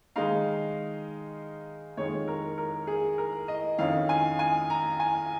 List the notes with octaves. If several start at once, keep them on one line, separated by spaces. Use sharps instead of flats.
D#3 G#3 D#4 F5
F2 D#3 G#3 C#5
A#4
A#4
G#4
A#4
D#5
F2 D#3 C#4 F5
G#5
G#5
A#5
G#5